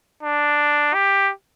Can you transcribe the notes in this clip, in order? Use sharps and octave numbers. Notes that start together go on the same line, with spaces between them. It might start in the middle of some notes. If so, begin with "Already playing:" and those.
D4
G4